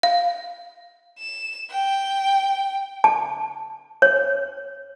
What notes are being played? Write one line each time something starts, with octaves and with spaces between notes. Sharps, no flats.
F5
E7
G5
A5
C#5